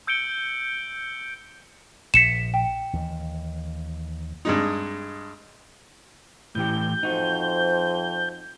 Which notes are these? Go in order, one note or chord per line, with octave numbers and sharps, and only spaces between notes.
E6 G6 C#7 D7 G7
A#1 B6 C#7 E7
G5
D#2 E3
G2 G#3 D#4
A2 E3 G4 G6
F2 D#4 F#4 C5